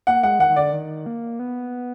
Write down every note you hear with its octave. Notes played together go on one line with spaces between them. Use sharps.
A#3 F#5
G#3 F#5
D#3 F#5
D#3
D3 D5
D#3
A#3
B3